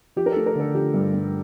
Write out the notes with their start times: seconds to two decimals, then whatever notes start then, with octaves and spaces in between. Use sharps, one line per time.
0.16 F3 G4
0.26 A#4
0.32 A3 A4
0.46 A#4
0.55 D3 A4
0.74 F3 G4
0.94 G2
1.13 G2